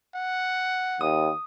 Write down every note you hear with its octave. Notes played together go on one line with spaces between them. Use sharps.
F#5
D#2 D#6